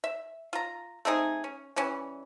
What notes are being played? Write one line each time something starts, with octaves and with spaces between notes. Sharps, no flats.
E5
F4 A#5
A3 C4 D#4 G#4
C#4
E3 G3 C#4